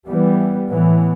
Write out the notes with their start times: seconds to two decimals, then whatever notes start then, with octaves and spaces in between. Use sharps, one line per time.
0.09 E3 G3 B3
0.70 A2 E3 B3